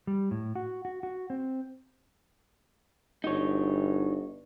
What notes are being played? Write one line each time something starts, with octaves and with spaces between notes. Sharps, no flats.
G3
A2
F#4
F#4
F#4
C4
G1 D#4 F#4 C#5